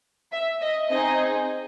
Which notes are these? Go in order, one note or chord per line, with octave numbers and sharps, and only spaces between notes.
E5
D#5
C4 D#4 G#4 D#5